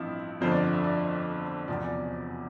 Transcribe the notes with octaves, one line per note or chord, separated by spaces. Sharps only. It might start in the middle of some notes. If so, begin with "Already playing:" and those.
Already playing: A1 G2 F3 C4 E4
G1 F2 D3 F3 C5
D5
D5
E5
D5
E1 E2 C3 F3 D5
D5